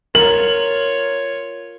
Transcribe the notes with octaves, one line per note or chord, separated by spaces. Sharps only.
F4 A#4 C#5 F#7